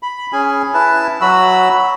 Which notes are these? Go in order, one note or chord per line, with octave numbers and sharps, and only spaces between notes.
B5
C#4 G#4 G#5
E4 B4 A5
F#3 F#4 B5 E6